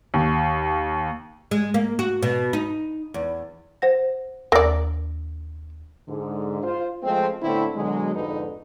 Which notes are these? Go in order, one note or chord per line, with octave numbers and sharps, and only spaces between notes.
D#2
G#3
A#3
F#4
B2
D#4
E2
C5 F#5 A#6
D#2 A#3 D5 E6 A#6
G#2 D3
F4 C5
F3 G#3 A3 C4
A2 D3 A3 B3 C4 E4
B2 D3 F#3 G#3
F2 G#2 D3 D#4 B4